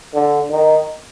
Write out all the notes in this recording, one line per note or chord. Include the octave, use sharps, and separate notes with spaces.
D3
D#3